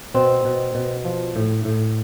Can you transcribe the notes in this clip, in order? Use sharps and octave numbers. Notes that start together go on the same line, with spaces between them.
B2 C4
B2
B2
F3
A2
A2